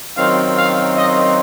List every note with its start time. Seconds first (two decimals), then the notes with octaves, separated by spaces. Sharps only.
0.17 F#2 D#3 F#3 C4 F4 F5
0.57 F5
0.97 D#5